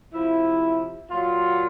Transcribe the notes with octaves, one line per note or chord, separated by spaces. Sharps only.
C3 F3 E4
A#2 F#3 F4